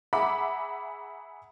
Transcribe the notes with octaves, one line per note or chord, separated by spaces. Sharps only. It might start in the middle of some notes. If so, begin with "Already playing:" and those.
G#4 E5 F#5 A#5 B5 D6